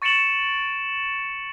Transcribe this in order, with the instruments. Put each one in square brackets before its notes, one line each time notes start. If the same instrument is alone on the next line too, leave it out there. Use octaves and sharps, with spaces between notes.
[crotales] C#6 A6 C#7 D7 E7 F#7